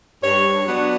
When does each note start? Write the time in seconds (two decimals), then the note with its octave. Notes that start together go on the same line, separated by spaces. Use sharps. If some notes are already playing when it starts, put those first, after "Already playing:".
0.23 G2 C#5
0.65 F#3 B3 D4